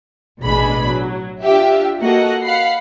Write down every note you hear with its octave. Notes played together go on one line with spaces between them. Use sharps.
A1 B2 G#3 D4 G#4 B5
F#3
D4 F4 G4 E5
A#3 F#4 A4 A#4 D#5 F#5
F5 F#5 B5 C7